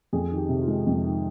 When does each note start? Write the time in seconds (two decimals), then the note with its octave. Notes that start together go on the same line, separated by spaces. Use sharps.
0.13 F2 G#4
0.31 D#3
0.37 G4
0.49 C3
0.61 F4
0.67 G#3
0.87 F2
1.05 D#3